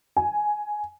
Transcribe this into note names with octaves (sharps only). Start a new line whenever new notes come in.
G#5